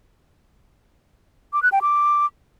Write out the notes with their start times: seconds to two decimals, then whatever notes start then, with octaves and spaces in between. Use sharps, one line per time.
1.53 D6
1.63 F#6
1.72 G5
1.82 D6